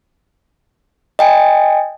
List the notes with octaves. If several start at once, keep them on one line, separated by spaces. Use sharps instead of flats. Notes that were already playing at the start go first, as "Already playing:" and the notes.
D#5 G5 G#5